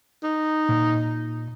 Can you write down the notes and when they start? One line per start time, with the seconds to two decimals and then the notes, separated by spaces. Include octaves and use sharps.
0.23 D#4
0.69 A#2